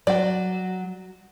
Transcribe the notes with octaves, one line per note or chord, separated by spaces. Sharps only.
F#3 D5 G5